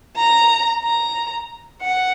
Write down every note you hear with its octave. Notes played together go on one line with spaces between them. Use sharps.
A#5
A#5
F#5